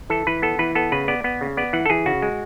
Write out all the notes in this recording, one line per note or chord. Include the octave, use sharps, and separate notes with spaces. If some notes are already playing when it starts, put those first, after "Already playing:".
E3 A4
E3 B4
B3 A4
E3 B4
B3 A4
C#3 B4
B3 D5
B3
C#3
B3 D5
E3 F#5
A4
E3 G#4
C#3 F#4
G#3